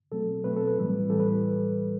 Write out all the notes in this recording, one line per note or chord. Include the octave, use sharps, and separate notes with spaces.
B2 F#3 A3 C4 A4
B2 F#3 A3 C4 B4
A4
B4
A2 E3 G3
A2 E3 G3 A4
B4